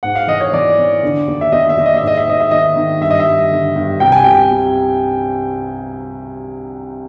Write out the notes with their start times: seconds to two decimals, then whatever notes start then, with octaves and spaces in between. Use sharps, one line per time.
0.03 G#2 F#5
0.16 F5
0.27 E3 D#5
0.40 C#5
0.53 E3 D5
0.78 E3
1.03 D3
1.27 D#2
1.41 E5
1.52 D#2 D#5
1.69 E5
1.77 D#2
1.86 D#5
1.97 E5
2.02 G#2
2.07 D#5
2.17 E5
2.27 G#2 D#5
2.40 E5
2.51 D#3 D#5
2.76 D#3
3.01 G2 E5
3.10 D#5
3.20 E5
3.27 G2
3.51 D3
3.76 G2
4.00 C2 G5
4.12 G#5
4.24 C2 G5
4.51 C3